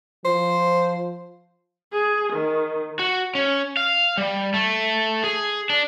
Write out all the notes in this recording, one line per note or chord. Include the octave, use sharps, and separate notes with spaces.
F3 C5
G#4
D#3
F#4
C#4
F5
G3
A3
G#4
D4